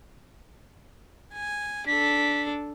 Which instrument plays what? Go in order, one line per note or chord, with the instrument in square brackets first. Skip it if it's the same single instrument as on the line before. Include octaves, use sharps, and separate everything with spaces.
[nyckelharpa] G#5
[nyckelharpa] D4 A4 [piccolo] B6